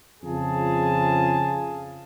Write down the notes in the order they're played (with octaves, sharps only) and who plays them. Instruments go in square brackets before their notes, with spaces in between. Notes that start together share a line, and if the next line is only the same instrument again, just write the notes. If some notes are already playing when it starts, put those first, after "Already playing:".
[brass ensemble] F2 C#3 F4 G#4 A5